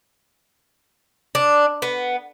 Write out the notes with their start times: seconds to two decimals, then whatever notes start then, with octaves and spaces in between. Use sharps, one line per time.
1.35 D4
1.82 B3